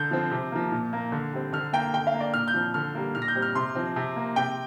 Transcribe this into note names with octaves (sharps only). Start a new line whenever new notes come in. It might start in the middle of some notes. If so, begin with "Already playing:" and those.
Already playing: D3 G6
F3 C4
C3
F3 A#3
A#2
A#3
D3
G3 C4
D3 F6
A#3 G5
D3 G5
F5
A#3
D5
A#2 F6
G6
F3 C4
D3 F6
G3 A#3
A#2 F6
A#6
G6
G3 C4
F6
C3 C6
F3 C4
C3
A#3
C3 G5